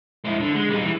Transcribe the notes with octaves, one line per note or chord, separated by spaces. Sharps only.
G#3 E4
D3
G#3
G3 D#4
E3